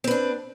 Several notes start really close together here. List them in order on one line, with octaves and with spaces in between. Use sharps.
C4 B4 D4